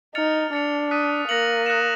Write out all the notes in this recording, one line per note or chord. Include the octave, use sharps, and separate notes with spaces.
D#4 F6 A6 C#7 F7
D4 A6 C#7 F7
D#6 F#6 B6 D#7
A#3 F#6 A#6 C#7 F#7
D#6 F#6 A#6 C#7 E7